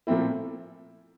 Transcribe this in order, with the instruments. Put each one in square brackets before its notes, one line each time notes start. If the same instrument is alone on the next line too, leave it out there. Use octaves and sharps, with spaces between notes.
[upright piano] A#2 F3 A3 C4 E4